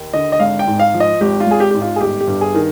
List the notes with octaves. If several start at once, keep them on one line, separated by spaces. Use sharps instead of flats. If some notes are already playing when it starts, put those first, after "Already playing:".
Already playing: D#2
D3 D#5
D#5
G#1 F5
G5
G#2
F5
F3
D#5
G#1 G4
F4
G#1 G#4
G4
G#2 G4
F4
G#4
G1 G4
G4
G2
G#4
D#3